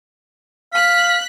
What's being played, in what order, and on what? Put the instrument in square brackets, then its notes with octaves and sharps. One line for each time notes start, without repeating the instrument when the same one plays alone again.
[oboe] F5 [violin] F#6 B6